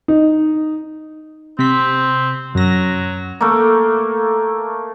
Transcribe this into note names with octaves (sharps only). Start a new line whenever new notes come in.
D#4
C3 C4 B6
F#2 F#3 A#6
A3 A#3